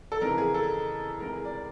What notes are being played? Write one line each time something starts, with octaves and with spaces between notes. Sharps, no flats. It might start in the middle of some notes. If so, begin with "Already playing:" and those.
A4
F2 C#3 E3 A#4
G#4
A4
C#2 C3 E3 A#4
G#4
D5